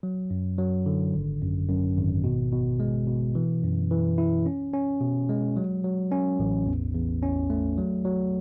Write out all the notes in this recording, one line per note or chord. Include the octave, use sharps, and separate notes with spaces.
F#3
F#2
F#3
D3
G#1
F#2
F#2
G#1
B2
B2
G#3
B2
E3
F#2
E3
E4
C#4
C#4
B2
G#3
F#3
F#3
C#4
A1
E2
E2
C#4
A3
F#3
F#3